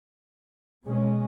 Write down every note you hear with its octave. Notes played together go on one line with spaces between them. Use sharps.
B2 G#3 C#4